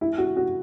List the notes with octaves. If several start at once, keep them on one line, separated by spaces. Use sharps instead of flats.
E4
F#4
F#4